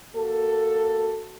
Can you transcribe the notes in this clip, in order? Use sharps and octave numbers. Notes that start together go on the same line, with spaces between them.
A#3 F#4 A4